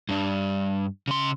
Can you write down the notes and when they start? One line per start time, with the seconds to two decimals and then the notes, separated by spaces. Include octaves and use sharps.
0.09 G2 D4
1.08 C#3 C6